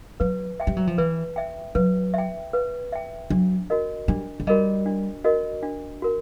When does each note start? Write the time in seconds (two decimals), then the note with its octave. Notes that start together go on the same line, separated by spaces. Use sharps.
0.20 F#3 B4
0.60 E5 G5
0.67 G3
0.77 F#3
0.87 F3
0.98 E3 B4
1.36 E5 G5
1.75 F#3 B4
2.14 E5 G5
2.53 B4
2.92 E5 G5
3.30 F#3 D4
3.70 F#4 A#4 D#5
4.08 G3 D4
4.40 G#3
4.47 G3 F#4 A#4 D#5
4.86 D4
5.24 F#4 A#4 D#5
5.63 D4
6.02 F#4 A#4